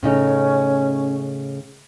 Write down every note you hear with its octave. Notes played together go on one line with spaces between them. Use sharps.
A2 C#3 C#4 D#4